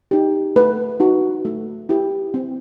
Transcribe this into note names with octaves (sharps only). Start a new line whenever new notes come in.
D#4 G4
A3 B4
D#4 F#4
A3
E4 G4
C4